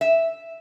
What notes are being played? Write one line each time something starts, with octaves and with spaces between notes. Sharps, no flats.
E5